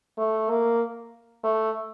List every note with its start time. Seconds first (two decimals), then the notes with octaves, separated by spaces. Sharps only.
0.18 A3
0.50 A#3
1.44 A3